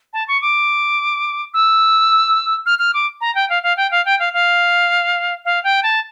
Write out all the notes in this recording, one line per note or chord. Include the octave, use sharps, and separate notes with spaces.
A5
C#6
D6
E6
F6
F6
D6
A#5
G5
F5
F5
G5
F5
G5
F5
F5
F5
G5
A5